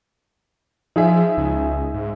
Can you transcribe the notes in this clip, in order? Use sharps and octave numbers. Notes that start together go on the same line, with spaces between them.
F3 D#4 G#4 E5
C#2
G#2